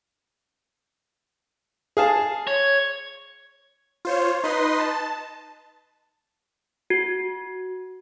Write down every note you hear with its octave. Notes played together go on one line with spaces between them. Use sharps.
G#4 F5 A5
C#5
F4 C5 C#5
D#4 B4 D#5 C6
A5
F#4